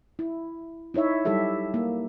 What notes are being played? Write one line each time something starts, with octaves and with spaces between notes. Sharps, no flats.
E4
D#4 E4 C#5 E5
F#3 G3 E4 G4 A4 E5
A#3